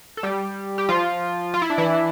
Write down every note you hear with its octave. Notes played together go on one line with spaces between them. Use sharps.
A4
G3 G4
G4
F3 F4
F4
E4
D4
E3 E4